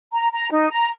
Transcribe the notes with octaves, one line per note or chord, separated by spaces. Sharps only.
A#5
A#5
D#4
A#5